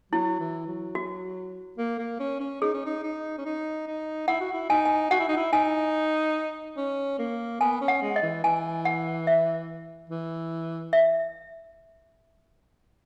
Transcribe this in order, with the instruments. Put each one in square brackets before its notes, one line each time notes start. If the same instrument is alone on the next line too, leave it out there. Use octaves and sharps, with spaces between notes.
[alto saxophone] F#3 [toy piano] E4
[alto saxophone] E3
F#3
[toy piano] F#4
[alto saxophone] A#3
A#3
C#4
C#4
[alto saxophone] D#4 [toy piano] G#4
[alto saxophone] C#4
D#4
D#4
C#4
D#4
D#4
[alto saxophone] E4 [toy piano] F#5
[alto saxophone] F#4
E4
[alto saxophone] D#4 [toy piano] G#5
[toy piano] G#5
[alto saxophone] F#4 [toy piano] F#5
[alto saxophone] E4
D#4
E4
[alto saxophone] D#4 [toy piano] G#5
[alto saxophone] C#4
A#3
[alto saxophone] B3 [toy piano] G#5
[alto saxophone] C#4
[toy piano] F#5
[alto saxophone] G#3
[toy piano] D#5
[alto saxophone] E3
[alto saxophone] E3 [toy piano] G#5
[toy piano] F#5
E5
[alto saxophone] E3
[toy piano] E5